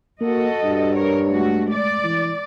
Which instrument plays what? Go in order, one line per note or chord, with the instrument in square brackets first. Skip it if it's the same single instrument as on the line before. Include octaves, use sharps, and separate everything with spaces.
[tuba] A#3 [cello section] F#4 A4 D#5
[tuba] G2
[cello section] A#4 C#5
G#3 A3 F#4
D5
[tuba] E3